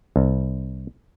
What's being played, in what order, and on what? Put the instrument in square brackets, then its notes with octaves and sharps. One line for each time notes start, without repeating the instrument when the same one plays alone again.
[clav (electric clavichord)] C2